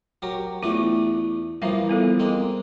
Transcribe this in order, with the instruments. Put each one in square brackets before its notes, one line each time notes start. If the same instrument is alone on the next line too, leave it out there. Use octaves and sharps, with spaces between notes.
[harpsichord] F#3 G4 A#4
[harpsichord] E2 A3 D4 [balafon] F4
[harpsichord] E3 F3 A#3 [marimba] G3 [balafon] E5 F5
[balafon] B3 F4 A4
[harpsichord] G#3 A#3 C4